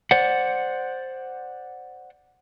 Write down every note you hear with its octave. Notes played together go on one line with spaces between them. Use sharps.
C5 D5 F#5